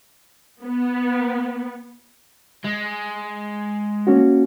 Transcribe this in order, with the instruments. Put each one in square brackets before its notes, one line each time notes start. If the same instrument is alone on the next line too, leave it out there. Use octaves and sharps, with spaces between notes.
[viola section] B3
[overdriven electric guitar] G#3
[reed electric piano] A#3 C#4 F#4